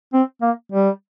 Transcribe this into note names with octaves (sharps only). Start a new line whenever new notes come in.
C4
A#3
G3